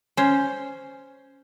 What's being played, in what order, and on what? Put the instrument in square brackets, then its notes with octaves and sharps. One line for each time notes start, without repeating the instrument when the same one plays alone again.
[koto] C#4 C5